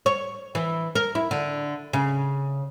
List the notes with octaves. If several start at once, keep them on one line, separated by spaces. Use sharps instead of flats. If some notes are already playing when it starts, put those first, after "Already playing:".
C#5
E3
A#4
E4
D3
C#3